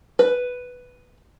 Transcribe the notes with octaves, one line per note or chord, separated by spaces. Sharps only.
B4